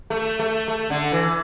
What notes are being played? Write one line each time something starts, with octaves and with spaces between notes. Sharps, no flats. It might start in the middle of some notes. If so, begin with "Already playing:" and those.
A3
A3
A3
D3
E3